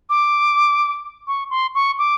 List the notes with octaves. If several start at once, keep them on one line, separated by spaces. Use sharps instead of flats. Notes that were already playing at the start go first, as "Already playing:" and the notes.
D6
C#6
C6
C#6
D6